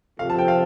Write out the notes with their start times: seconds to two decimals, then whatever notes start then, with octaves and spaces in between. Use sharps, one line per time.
0.19 C3 F3 C4 F4 A4 F5
0.30 A5
0.38 G5
0.48 F5